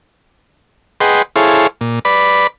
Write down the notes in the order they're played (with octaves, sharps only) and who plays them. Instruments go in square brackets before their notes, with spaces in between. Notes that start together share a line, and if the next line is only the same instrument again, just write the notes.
[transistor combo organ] G#4 B4 D#5 F#5 G5 C6
E4 G#4 A4 C5 C#5 F5
A#2
B4 D5 B5